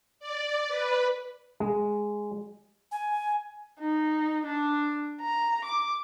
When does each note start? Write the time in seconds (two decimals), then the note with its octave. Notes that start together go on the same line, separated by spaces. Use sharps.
0.20 D5
0.68 B4
1.60 G#3
2.92 G#5
3.80 D#4
4.46 D4
5.21 A#5
5.64 D6